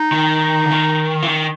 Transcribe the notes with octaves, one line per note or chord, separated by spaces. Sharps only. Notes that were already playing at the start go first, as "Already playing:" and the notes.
Already playing: D#4
D#3
D3
D#3
E3
D#3